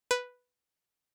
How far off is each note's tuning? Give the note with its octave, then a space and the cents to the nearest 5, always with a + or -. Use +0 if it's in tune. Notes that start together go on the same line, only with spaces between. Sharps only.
B4 +0